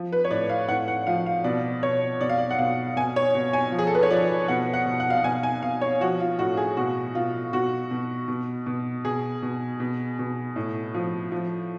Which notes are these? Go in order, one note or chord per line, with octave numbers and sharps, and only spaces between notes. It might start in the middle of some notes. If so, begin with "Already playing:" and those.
Already playing: F3
B4
C#5
A2 D5
F5
A2 F#5
F#5
F3 F5
F5
B2 D5
B2 C#5
B2 D5
F5
D5
F#5
B2 F5
B2 G#5
C#5
B2
G#5
F3
G#4
A4
B4
C#5
F3 D5
B2 F#5
F#5
B2
F#5
F5
F#5
B2 G#5
G#5
B2 F5
C#5
F3 F#4
F4
A2 F#4
G#4
B2 F#4
B2 F4
B2 F#4
B2
B2
B2
B2 G#4
B2
B2
B2
A2
F3
F3